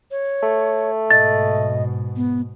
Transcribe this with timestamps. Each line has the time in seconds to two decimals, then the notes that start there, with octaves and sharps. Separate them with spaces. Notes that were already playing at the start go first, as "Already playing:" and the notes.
0.11 C#5
0.43 A3
1.10 G#2 B2 D#5 A6
2.16 B3